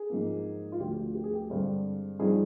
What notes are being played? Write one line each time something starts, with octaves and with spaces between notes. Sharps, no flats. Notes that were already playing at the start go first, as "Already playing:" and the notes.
Already playing: G#4
G#2 F3 A#3
F4
D2 D3 F3 G4
G4
G#4
G4
G2 D3 G#3 C4
G2 F3 C4 D#4 G#4